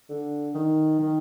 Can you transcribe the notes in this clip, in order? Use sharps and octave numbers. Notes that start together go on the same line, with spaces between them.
D3
D#3
D#3